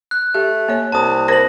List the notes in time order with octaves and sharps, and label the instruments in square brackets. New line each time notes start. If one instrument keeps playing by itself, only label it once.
[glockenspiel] F#6
[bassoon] A3 [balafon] G4
[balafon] A#3 C#5
[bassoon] C2 [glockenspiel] A5 D#6
[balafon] A#4 C5 [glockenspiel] A#6 F#7